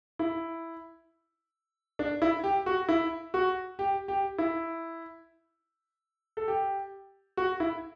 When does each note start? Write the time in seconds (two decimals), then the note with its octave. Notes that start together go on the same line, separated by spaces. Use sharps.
0.19 E4
1.99 D4
2.22 E4
2.44 G4
2.66 F#4
2.89 E4
3.34 F#4
3.79 G4
4.08 G4
4.38 E4
6.37 A4
6.48 G4
7.37 F#4
7.60 E4